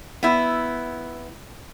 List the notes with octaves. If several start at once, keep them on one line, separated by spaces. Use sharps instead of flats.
B3 E4